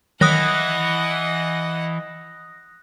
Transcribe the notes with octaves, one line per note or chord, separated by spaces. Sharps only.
D#3 E3 F#3 D#5 F#5 D#6 F#6 A#6